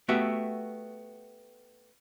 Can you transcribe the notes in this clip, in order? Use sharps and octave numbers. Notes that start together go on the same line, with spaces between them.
A3 B3 F#4 G4 E5